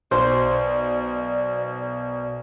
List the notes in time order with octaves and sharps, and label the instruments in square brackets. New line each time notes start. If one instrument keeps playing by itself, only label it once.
[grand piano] B1 [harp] C5 [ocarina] D5